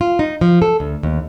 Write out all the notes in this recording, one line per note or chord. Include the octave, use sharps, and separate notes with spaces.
F4
D#4
F3
A4
D2
D#2